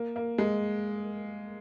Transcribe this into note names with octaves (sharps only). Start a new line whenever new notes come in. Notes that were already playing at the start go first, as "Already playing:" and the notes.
Already playing: A#3
A#3
G#3